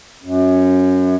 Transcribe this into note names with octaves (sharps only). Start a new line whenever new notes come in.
F#2